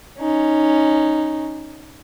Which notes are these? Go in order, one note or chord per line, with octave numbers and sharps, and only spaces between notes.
C#4 D#4